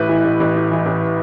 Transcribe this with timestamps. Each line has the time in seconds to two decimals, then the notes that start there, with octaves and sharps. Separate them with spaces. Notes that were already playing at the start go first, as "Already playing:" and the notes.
Already playing: A1 A2 B4
0.09 E3
0.25 A1
0.40 A1
0.56 A2
0.71 E3
0.86 A1